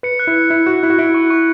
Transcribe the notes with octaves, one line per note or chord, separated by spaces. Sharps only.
B4 C#7
F#6
E4
F#6
E4 F#6
F#4 F#6
E4 F#6
F#4
E4 D7
C#6
C#6